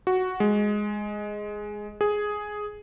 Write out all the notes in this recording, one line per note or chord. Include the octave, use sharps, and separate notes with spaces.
F#4
G#3
G#4